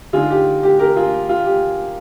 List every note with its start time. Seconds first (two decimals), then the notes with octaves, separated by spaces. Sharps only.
0.13 D3 G#3 D#4 F4 G#4
0.30 G4
0.63 G4
0.79 G4 A#4
0.96 F4 G#4
1.29 F4
1.45 G4